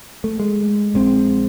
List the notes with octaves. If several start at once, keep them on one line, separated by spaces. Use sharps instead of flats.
A3
G#3
A#1 G#3 C4